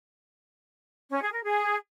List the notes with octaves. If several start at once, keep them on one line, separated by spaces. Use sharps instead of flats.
C#4
G#4
A#4
G#4